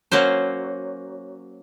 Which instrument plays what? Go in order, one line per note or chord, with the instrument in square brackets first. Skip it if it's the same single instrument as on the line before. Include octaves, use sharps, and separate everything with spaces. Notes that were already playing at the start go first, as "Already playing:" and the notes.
[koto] F#3 A#3 C#4 C5